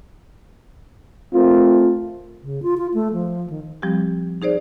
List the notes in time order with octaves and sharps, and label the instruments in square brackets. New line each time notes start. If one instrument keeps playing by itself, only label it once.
[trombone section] A3 C4 F4 A#4
[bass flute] C#3
F4
F4
A3
F3
D#3
[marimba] F3 G3 C4 G4
D#4 G#4 C5 D5